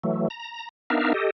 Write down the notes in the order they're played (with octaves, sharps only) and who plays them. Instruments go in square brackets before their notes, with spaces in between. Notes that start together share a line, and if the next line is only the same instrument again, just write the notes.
[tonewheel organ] E3 F#3 A3
A#5
B3 D4 D#4 A#4 E5 F5
G4 A4 D#5